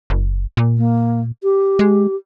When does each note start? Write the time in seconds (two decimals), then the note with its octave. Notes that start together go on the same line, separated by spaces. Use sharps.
0.10 F#1
0.57 A#2
0.77 A#3
1.43 G4
1.79 G#3